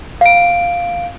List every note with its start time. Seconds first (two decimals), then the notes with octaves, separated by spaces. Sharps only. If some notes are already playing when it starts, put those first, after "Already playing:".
0.21 F5 D7